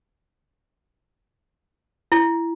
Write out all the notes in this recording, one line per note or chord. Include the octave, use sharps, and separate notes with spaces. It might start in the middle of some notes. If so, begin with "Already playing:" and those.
E4